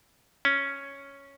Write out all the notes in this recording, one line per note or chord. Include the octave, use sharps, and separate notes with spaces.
C#4